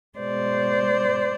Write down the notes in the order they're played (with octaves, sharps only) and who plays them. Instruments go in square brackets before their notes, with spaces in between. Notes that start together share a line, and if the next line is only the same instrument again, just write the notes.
[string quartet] B2 G#3 C5 D5